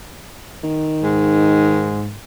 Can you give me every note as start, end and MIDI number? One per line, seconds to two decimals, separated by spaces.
0.63 1.97 51
1.03 2.12 44